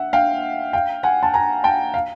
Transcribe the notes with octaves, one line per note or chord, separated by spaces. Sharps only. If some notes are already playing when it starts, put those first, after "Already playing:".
Already playing: E5 F#5
F5 G5
F5 G5
F#5 G#5
A5
G#5 A#5
G5 A5
F5